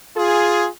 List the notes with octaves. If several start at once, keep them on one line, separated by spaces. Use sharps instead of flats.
F4 G#4